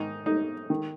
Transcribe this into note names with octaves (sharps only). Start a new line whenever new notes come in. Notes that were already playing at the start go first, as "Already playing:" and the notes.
Already playing: G#2 D#3 D#4
D#4
D#3